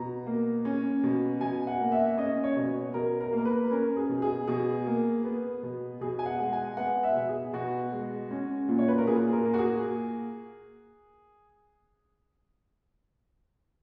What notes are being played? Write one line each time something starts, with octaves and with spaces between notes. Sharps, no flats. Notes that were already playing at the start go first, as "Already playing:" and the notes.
Already playing: B2 A#5
A#3
C#4
B2
B2 G#5
F#5
A#3
E5
C#4 D#5
C#5
B2
B2 A#4
A#4
A#3
A#4
B4
C#4 A#4
G#4
B2
G#4
B2 G#4
A#3
B3
B2
B2 G#4
G#5
F#5
G#3
G#5
B3 F#5
E5
B2
G#4
B2 F#4
G#3
C#4
A#2
C#5
B4
A#4
A#2 G#4
A#4
A#3
F#4
G#4